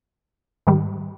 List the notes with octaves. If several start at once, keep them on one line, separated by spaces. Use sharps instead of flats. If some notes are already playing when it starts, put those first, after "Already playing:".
G#2 D#3 G3